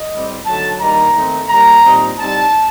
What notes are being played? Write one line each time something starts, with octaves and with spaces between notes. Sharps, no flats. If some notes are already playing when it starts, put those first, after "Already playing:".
Already playing: D#5
A2 G3 C4
D3 F#3 A3 D#4 A5
G2 D#3 G3 A#3 D#4 A#5
D#3 A3 C4 D#4
D#3 G3 A#3 A#5
A#2 G3 C4 D#4
A2 G3 C4 D#4 A5